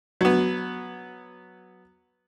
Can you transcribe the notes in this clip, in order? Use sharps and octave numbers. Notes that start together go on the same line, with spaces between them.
F#3 B3